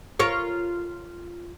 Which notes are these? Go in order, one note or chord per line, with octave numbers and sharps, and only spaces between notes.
F4 A#4 C#5